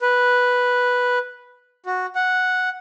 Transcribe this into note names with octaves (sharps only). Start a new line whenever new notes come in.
B4
F#4
F#5